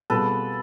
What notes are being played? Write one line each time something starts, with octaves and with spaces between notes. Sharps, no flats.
B2 G3 C4 F4 G#4 A4 B4